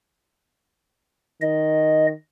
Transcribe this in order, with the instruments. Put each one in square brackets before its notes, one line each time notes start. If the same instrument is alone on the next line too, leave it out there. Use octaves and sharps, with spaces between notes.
[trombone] D#3 [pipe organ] D#5